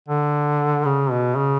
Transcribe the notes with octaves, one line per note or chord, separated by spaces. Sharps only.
D3
C#3
B2
C#3